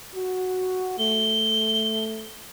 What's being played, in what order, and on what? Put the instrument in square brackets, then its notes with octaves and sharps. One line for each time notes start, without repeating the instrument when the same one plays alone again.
[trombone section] F#4
[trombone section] A3 [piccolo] G7